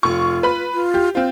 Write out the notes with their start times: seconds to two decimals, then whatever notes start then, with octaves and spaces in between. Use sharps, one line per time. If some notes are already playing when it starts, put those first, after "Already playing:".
0.03 F1 F4 C#6
0.43 B4 B5
0.74 F4
0.94 G4
1.15 C4 F4 C5